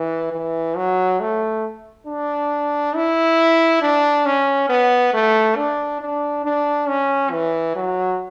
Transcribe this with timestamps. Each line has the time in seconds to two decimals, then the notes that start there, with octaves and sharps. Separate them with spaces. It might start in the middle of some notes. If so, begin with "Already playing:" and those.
Already playing: E3
0.32 E3
0.76 F#3
1.20 A3
2.07 D4
2.95 E4
3.82 D4
4.26 C#4
4.69 B3
5.14 A3
5.56 D4
6.01 D4
6.45 D4
6.88 C#4
7.32 E3
7.76 F#3